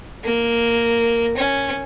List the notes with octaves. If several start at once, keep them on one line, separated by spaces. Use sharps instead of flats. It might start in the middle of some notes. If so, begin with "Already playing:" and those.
A#3
C#4